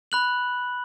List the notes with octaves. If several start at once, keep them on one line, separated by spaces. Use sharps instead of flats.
B5 F#6 F#7